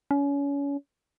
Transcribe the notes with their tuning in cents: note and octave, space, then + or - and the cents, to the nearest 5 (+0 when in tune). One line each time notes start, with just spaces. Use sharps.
C#4 +30